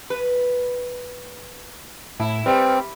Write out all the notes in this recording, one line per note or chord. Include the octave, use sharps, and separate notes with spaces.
B4
A2 E4
G3 C4 B4